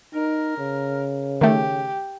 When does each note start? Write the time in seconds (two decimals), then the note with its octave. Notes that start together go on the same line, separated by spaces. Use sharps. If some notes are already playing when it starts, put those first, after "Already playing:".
0.15 D#4 A#4
0.58 C#3
1.41 D#3 A3 G4